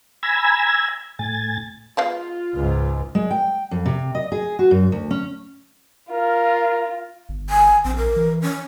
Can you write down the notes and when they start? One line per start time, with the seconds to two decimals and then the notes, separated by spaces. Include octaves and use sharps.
0.23 G#5 A#5 B5 E6 G#6
1.19 A2 G#5 A6
1.97 G#3 B3 F4 F5
2.55 C#2 G#2
3.15 G#3
3.31 G5
3.71 F2
3.86 C3
4.15 D#5
4.32 G#4
4.59 F#4
4.71 F#2
4.92 D2
5.11 C#4
6.11 F4 A#4
7.29 G1
7.50 G#5
7.84 A#1 C4
7.96 A#4
8.16 E3
8.42 C#4